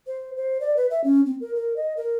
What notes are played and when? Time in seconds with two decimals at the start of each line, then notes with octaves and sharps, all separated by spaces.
0.07 C5
0.36 C5
0.61 D5
0.77 B4
0.91 E5
1.04 C#4
1.26 C4
1.41 A#4
1.55 A#4
1.76 D#5
1.97 A#4